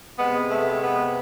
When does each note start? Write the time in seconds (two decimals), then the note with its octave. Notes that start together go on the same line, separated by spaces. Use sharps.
0.18 C3 G#3 B3
0.50 A3
0.82 B3